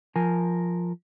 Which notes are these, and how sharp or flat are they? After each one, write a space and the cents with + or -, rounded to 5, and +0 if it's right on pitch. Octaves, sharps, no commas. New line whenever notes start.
F3 +0 A#4 +0 G#5 +0